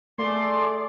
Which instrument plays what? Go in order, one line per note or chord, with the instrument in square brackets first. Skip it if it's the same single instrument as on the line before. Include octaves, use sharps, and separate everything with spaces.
[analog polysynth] A3 [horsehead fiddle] G#4 D5 [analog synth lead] C6